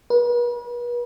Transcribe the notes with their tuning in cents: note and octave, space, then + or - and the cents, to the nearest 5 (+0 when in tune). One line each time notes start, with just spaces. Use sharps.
B4 -40